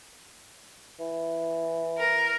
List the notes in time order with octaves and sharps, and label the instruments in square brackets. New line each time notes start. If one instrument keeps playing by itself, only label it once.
[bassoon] E3
[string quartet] A#4